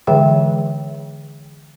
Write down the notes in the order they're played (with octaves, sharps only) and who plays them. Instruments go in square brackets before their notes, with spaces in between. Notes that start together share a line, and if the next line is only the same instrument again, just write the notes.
[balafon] D3 E3 G#3 G#4 E5 G5